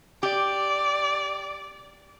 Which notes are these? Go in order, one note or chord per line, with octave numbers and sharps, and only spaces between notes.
G4 D5